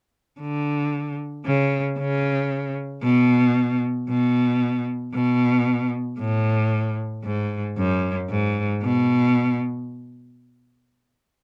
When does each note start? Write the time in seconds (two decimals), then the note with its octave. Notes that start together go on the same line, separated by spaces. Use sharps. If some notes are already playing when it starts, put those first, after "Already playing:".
0.41 D3
1.46 C#3
1.99 C#3
3.03 B2
4.09 B2
5.14 B2
6.19 A2
7.24 G#2
7.77 F#2
8.29 G#2
8.83 B2